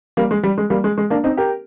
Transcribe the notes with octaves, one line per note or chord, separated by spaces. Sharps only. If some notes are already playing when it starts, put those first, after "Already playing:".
G3 A#3
G#3
G3
G#3
G3 A#3
G#3
G#3
A#3 D4
C4 D#4
G4 A#4